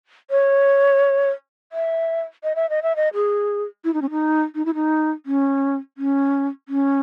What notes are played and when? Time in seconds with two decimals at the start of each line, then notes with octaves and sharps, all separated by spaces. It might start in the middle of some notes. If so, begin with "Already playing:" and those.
0.30 C#5
1.72 E5
2.43 D#5
2.56 E5
2.70 D#5
2.82 E5
2.96 D#5
3.14 G#4
3.84 E4
3.94 D#4
4.02 C#4
4.10 D#4
4.55 D#4
4.65 E4
4.74 D#4
5.26 C#4
5.98 C#4
6.68 C#4